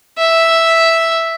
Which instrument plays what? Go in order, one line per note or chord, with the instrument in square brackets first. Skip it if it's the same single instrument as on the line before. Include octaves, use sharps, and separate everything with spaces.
[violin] E5